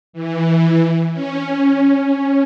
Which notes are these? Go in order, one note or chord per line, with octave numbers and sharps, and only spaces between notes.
E3
C#4